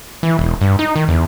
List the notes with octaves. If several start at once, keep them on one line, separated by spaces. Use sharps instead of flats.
E3
E1
G2
D#4
D#3
E2